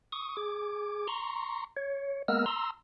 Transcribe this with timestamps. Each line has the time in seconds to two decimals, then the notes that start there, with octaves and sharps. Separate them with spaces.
0.12 C#6 D#6
0.37 G#4 D6
1.08 A#5 C6 C#6
1.76 C#5
2.28 G#3 A#3 B3 A#4 E6 F6
2.46 A#5 C6 E6